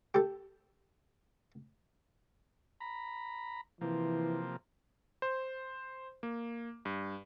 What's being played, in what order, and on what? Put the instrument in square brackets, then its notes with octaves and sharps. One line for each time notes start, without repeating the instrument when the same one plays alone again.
[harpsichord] G4 A4
[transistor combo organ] A#5 B5
[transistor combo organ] C3 F3 A#3 [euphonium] E3
[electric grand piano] C5
A#3
G2